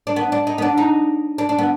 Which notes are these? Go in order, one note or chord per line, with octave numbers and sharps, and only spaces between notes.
D4
B3
D4
D#4
B3
D4
D#4
D4
D4
B3